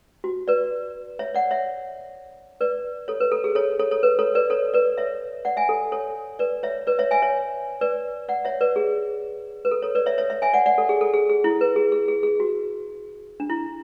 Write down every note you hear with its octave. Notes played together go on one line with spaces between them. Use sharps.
F#4
B4 D5
C#5 E5
D5 F#5
C#5 E5
B4 D5
A4 C#5
B4
A4
G#4
A4 C#5
A4 C#5
A4 C#5
B4
A4 C#5
B4 D5
A4 C#5
B4 D5
C#5 E5
D5 F#5
E5 G#5
A4
A4 C#5
B4 D5
C#5 E5
B4 D5
C#5 E5
E5 G#5
C#5 E5
B4 D5
D5 F#5
C#5 E5
B4 D5
G#4
B4
A4
A4 C#5
B4 D5
C#5 E5
C#5 E5
C#5 E5
E5 G#5
D5 F#5
D5 F#5
A4
G#4
A4
G#4
G#4
E4
B4
G#4
G#4
G#4
G#4
F#4
D4
E4